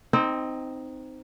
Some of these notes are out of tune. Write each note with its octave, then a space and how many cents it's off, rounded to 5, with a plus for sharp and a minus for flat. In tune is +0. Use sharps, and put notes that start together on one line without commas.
C4 -10 D#4 +0 G5 +35